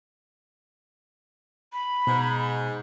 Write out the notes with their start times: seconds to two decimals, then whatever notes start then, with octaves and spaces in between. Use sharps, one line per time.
1.73 B5
2.07 G#2 B2